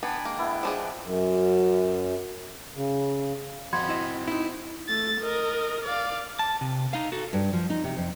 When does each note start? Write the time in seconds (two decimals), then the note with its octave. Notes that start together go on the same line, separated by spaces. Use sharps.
0.03 B3 D4 G5 G#5 B5
0.25 G#3 A#3 G5
0.39 B3 E4
0.63 F3 D4 G#4
1.04 F#2
2.76 C#3
3.73 F2 C4 F#4 B5 C6 G#6
3.89 E4 D#5
4.28 D#4 E4
4.88 A3 A6
5.21 A#4 D#5
5.84 D5 F5
6.39 A5
6.61 C3
6.93 D#4 F5
7.12 F#4 A4
7.33 G2
7.53 F3
7.70 D#4
7.84 C3
7.97 F2